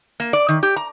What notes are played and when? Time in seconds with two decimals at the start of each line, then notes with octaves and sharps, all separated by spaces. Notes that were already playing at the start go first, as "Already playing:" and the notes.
0.20 A#3
0.33 D5
0.49 D#3
0.63 G4
0.76 A#5